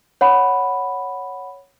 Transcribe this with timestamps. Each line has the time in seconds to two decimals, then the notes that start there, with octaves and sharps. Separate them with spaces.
0.21 C#5 F#5 B5